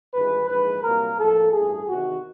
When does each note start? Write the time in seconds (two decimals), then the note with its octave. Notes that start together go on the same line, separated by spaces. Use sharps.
0.13 G#1 G2 E3 G#3 B4
0.48 A#1 G#2 E3 G#3 B4
0.83 C2 A#2 F#3 A#3 A#4
1.18 A2 F3 A#3 A4
1.52 A1 G2 E3 A3 G#4
1.88 E2 C3 D#3 F#4